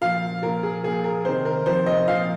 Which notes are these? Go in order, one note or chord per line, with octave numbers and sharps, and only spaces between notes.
A#2 F3 F5
A#2 F3 A#4
G#4
A#2 F3 G#4
A#4
C3 D#3 C5
A#4
C3 F3 C5
D#5
A#2 F3 F5